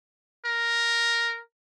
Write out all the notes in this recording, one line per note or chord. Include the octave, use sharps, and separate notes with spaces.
A#4